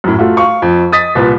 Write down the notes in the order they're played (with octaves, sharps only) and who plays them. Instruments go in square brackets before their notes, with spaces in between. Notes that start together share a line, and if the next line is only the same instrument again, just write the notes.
[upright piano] F#2 A2
A3 F4 F#4
F5 C#6
F2
D#5 D#6 A6 B6
C2 A#2 B4